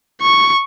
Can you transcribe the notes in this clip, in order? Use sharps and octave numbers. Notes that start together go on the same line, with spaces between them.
C#6